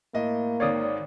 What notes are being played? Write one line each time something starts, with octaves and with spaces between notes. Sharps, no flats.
A2 A#3 D#5
G#1 D#3 C#5 D5 F5 D#6